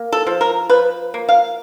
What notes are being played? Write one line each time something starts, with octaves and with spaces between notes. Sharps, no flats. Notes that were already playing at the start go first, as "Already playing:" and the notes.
Already playing: A#3
A4
F3
A#4
F3 B4
A#3
F5